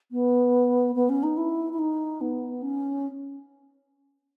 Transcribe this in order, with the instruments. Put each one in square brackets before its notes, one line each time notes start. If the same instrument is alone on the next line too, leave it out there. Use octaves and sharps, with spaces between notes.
[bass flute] B3
B3
C#4
D#4
E4
E4
D#4
B3
C#4